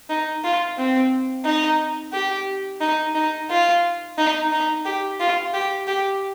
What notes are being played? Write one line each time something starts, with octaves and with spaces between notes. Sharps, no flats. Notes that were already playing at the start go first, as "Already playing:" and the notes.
D#4
F4
C4
D#4
G4
D#4
D#4
F4
D#4
D#4
G4
F4
G4
G4